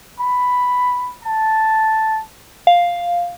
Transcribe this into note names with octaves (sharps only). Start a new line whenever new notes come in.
B5
A5
F5